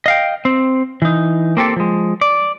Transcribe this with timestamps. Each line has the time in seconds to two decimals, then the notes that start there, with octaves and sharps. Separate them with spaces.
0.06 D#5 F5 G5
0.45 C4
1.02 E3 D#4
1.57 A#3 C4 G4 A4
1.76 F3 G#3
2.21 D5